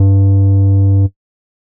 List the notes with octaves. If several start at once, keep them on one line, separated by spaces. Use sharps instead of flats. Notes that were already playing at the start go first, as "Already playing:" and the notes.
Already playing: G2